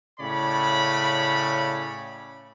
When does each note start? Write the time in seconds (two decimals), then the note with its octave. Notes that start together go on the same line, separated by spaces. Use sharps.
0.19 A2 C#3 C#5 D5 B5